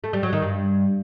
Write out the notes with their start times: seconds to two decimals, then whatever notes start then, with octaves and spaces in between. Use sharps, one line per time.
0.04 A3
0.13 G3
0.23 F#3
0.33 D#3
0.42 G2